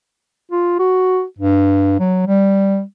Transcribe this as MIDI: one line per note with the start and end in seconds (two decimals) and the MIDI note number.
0.52 0.76 65
0.79 1.23 66
1.39 1.98 43
2.00 2.26 54
2.27 2.82 55